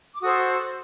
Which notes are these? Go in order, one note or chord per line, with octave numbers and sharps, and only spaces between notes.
D6
F#4 A4 C5 D#6